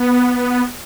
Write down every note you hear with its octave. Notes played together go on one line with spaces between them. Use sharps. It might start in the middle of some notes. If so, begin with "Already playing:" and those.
Already playing: B3